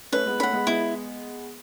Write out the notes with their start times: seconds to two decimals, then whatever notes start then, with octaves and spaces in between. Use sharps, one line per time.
0.12 A3 C#4 B4
0.26 G#3 B3
0.40 A3 C#4 F#5 B5
0.53 G#3 B3
0.67 G#3 B3 E4